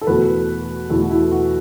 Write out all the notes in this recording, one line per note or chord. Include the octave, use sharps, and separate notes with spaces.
A4
E2 B2 A3 F#4 B4
E2 B2 A3 E4 A4
F#4
E4
F#4